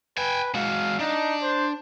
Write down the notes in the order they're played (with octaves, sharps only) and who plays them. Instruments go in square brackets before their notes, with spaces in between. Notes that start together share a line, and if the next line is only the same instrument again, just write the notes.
[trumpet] B4 [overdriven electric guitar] G5 G#5
[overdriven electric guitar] G#3 F#4 [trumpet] F5
[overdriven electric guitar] D4 [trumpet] D#4
[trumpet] C5